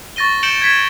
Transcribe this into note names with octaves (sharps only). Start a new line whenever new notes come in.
C#6 A6 A#6 D#7 G7
G6 C#7 D7 E7 F#7 G7
G#6 B6 E7